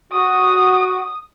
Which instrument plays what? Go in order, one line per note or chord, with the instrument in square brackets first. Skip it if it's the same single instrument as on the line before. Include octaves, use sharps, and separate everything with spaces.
[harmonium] F#4 [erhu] D#6